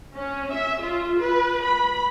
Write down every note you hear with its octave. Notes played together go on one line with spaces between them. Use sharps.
C#4
E5
F4
B4
B5